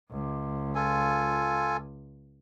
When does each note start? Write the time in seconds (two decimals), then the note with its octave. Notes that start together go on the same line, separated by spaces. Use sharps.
0.11 C#2
0.75 F4 A4 G#5